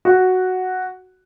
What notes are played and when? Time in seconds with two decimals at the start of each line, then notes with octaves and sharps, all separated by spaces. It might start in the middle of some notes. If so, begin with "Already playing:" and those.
0.05 F#4